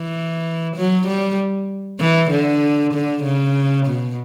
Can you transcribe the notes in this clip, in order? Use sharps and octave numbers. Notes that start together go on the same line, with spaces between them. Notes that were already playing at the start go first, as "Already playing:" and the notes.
Already playing: E3
F#3
G3
E3
D3
D3
C#3
B2